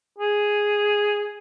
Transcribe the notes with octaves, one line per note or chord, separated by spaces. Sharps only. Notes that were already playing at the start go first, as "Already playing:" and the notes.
G#4